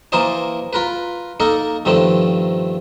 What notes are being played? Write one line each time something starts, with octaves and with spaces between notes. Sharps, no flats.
E3 A#3 A#4 C5 D#5 A5
F4 A#4 B4
A#3 D#4 A4 A#4
G2 D#3 F3 A3 C4